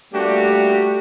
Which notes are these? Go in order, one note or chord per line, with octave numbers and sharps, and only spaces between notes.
G3 A3 A#3 D4 F#4 G4